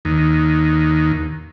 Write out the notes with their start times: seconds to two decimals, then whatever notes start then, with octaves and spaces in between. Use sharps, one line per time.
0.05 D#2